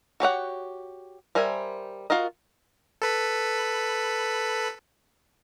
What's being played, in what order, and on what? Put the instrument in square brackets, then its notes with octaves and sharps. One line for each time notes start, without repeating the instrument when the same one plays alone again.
[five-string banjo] F#4 G4 C#5 F#5
G3 A#4 C5 E5 G#5
F4 F#4 A#4 D#5
[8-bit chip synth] A4 B4 B5